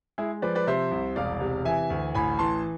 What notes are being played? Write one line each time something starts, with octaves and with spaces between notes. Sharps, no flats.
G#3 E4 G#4
F3 B4 D5
B4 D5
C3 C5 E5
C2
E1 D5 F5
C3
E3 E5 G#5
D2
A1 G#5 B5
E3 A5 C6